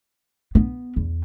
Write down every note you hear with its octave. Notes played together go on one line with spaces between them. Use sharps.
B3
E2